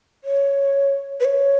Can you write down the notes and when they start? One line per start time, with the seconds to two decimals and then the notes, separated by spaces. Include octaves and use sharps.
0.24 C#5
1.20 B4
1.25 C#5